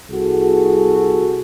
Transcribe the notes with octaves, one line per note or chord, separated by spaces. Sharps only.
C2 F#4 G#4 A4